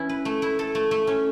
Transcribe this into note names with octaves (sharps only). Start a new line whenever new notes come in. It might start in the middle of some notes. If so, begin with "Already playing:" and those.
Already playing: E3 C#4 E4
B4
A3
E4
A4
A3
A3
C#4